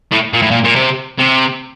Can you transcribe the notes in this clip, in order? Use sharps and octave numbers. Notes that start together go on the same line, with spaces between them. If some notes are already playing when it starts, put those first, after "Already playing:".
A2
A#2
A2
A#2
A#2
C3
C3